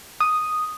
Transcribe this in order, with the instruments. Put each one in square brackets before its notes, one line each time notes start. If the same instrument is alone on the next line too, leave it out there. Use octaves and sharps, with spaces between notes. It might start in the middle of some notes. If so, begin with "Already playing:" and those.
[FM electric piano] D#6